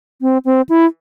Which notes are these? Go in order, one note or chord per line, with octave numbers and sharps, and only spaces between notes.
C4
C4
E4